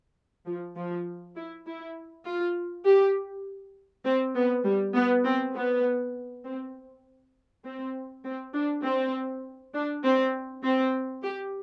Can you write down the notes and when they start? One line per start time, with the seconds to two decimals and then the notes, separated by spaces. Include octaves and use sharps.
0.46 F3
0.76 F3
1.36 E4
1.66 E4
2.25 F4
2.85 G4
4.05 C4
4.35 B3
4.64 G3
4.95 B3
5.25 C4
5.55 B3
6.45 C4
7.64 C4
8.25 C4
8.54 D4
8.84 C4
9.74 D4
10.04 C4
10.64 C4
11.23 G4